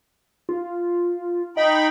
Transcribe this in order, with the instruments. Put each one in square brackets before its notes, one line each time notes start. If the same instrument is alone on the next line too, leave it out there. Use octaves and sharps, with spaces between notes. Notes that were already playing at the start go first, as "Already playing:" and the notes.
[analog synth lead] F4
[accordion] D#4 G5 B5 [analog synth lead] D#5